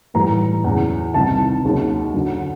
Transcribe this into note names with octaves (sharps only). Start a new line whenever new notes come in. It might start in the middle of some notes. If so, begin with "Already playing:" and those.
A2 E3 G3 A#5
E2 C#3 F#3
C2 C3 D#3 A5
D#2 C#3 F#3
F#2 D3 F#3